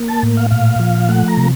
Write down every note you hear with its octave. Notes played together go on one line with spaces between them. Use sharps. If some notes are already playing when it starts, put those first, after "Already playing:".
Already playing: A#3
A5
A2
F5
A#2 F5
F3
A3 F#5
A#5
C3